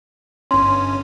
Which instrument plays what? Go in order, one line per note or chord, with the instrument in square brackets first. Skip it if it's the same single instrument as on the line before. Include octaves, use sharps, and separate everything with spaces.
[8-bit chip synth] G1 C#4 [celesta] C6